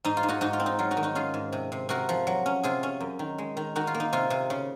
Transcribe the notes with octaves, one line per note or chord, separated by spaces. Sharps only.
G#2 D#4
F4
G#2
D#4 F#4
G#2 D#4 F#4
F4
C4
D#4
F#3 F4
D#4 F#4
D#3
D#4 F#4
C#4 F4 G#4
G#2
C3
C3
C3 F#4 A#4
F3
F#3
C#4
C3 F4 G#4
C#4
F#2
D#3
G#3
D#3
D#3 D#4 F#4
F4
A#3
D#4
C3 F4
C3
C#3